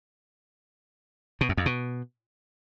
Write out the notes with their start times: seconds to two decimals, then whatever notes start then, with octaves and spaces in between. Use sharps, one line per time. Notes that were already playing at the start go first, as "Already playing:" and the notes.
1.41 B2
1.49 F#2
1.57 F2
1.66 B2